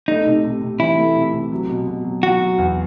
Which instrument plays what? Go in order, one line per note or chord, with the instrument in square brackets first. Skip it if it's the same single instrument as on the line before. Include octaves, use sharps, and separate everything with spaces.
[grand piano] A3 [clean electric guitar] D#4
[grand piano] C3
C3
C3
[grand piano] E3 [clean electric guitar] E4
[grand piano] A3
C3
C3
F#3
B2
B2
F#3
[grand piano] F#3 [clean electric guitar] F#4
[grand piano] F#3
E2